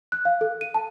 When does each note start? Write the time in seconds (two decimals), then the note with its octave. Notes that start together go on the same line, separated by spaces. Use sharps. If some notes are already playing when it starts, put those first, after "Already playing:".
0.12 F#6
0.25 F5
0.41 A4
0.61 D#7
0.74 A5